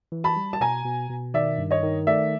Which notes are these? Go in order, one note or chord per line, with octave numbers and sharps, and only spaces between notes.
E3
A5 B5
G3
A5
B2 G#5 A#5
B2
B2
D#3 D5 E5
G2
C#5 D#5
D#3
A3 D5 E5